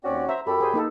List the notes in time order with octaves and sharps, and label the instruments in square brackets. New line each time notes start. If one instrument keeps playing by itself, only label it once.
[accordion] D#2 C4 D5 [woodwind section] C#4 F#4
[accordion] C5 A#5 [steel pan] E5
[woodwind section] F#2 [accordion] G4 B5 [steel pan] A4
[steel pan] G#4 C5
A#3 D#4 A4